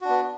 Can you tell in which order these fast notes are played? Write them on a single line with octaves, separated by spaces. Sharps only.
F#4 D4 B3